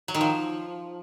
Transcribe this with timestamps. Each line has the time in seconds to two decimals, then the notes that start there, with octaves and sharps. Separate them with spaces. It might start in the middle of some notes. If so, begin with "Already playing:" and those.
0.08 F#3
0.14 D#3
0.21 F3